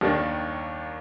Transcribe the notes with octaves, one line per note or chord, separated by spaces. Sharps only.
D#2 D#3 G3 A#3 D4